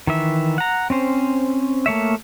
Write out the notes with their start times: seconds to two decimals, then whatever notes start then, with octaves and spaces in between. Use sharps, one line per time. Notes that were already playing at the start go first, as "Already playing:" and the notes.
0.07 D#3 E3 E5
0.58 F#5 A#5
0.90 C4 C#4 C5
1.86 A3 A#3 C#5 E5